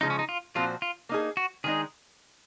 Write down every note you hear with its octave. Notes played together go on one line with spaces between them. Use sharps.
C#3 F3 G#3 D#4
C#4
D#4
F4
A#2 F3 C4 F4 F#4 C5
F4
A#3 D#4 G#4
F#4
D#3 G#3 D#4 G#4